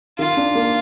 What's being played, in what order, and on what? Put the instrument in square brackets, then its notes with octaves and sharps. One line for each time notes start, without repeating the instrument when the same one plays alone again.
[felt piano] D#3 [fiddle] F4
[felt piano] D4
A#3